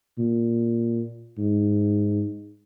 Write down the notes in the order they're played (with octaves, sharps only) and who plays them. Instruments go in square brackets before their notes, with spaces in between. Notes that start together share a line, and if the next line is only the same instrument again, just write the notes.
[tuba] A#2
G#2